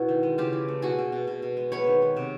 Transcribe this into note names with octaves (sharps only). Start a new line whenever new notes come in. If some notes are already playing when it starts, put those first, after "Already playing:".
Already playing: B2 B3 E4 F#4
D#3
G#3
C#3 F4 G4
E3
A3
B2 F#4 G#4
B2
B2
B2
B2
G#3
B3 B4 C#5
D#3
B3
C3